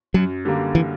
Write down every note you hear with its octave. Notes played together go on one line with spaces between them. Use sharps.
F#2 F#3
D3 G3 A#3
E3